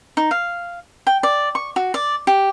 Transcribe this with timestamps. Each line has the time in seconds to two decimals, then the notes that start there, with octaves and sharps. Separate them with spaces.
0.17 D#4
0.31 F5
1.07 G5
1.23 D5
1.55 C#6
1.76 F#4
1.94 D5
2.27 G4